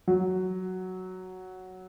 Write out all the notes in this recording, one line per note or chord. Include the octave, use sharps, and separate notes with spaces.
F#3